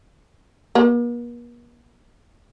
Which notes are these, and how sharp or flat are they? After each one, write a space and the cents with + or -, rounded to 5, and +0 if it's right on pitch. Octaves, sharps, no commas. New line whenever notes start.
A#3 +45